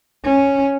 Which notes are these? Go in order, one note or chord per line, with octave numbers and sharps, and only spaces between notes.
C#4